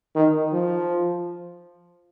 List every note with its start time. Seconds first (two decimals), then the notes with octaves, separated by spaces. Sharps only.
0.16 D#3
0.53 F3